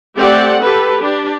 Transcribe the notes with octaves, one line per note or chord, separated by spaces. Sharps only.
A3 C4 G4 D5 F#5
G4 A4 B4
D4 G4